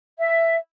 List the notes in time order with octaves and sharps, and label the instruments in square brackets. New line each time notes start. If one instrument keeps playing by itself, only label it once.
[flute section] E5